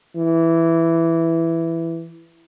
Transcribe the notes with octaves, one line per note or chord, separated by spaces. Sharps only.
E3